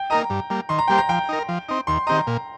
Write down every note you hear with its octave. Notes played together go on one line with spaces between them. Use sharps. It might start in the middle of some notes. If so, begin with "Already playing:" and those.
Already playing: G5
A#3 D#4 A#4 D#5 A#5
G2
G3 A#3
D#3 C6
A#5
G3 A#3 G4 C5 G5
A#5
F3 G5
D#4 A#4
F3
C4 D#4
D#2 C6
D#3 C4 G4 D#5 A#5
A#2